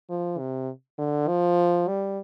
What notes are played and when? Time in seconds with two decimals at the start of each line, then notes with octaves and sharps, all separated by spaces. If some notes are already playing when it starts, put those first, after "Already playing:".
0.10 F3
0.39 C3
0.98 D3
1.28 F3
1.88 G3